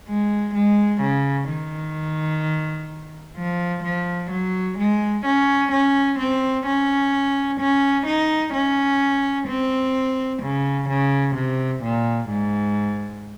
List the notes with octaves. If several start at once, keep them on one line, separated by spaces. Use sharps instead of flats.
G#3
G#3
C#3
D#3
F3
F3
F#3
G#3
C#4
C#4
C4
C#4
C#4
D#4
C#4
C4
C#3
C#3
C3
A#2
G#2